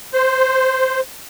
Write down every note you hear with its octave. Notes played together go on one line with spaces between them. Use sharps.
C5